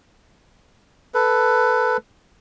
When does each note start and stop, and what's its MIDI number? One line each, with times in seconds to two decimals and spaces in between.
1.14 1.97 69
1.14 1.97 71